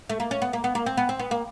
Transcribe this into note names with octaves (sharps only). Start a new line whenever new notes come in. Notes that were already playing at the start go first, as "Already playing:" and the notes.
A3
A#3
C#4
B3
A#3
B3
A#3
C4
B3
C4
B3
A#3